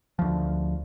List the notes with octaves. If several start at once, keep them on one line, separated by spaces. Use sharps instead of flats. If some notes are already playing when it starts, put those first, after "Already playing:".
D2 F3